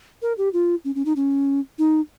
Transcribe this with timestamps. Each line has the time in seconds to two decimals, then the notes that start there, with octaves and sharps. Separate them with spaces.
0.22 A#4
0.38 G4
0.53 F4
0.85 C#4
0.95 C#4
1.06 D#4
1.16 C#4
1.79 D#4